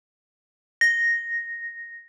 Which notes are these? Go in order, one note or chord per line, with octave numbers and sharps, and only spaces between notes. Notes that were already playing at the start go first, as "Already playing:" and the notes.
A#6